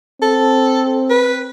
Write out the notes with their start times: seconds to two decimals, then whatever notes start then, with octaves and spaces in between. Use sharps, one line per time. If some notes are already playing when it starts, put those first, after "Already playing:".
0.22 C4 A4
1.10 B4